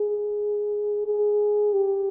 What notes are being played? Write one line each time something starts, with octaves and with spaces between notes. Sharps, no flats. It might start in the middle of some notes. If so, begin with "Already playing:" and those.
Already playing: G#4
G#4
G4